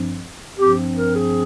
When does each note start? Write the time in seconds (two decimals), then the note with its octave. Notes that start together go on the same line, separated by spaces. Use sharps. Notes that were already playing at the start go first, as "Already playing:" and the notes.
Already playing: G2 F3 C4
0.57 G2 F3 C4 G4
0.94 A#4
1.13 G#4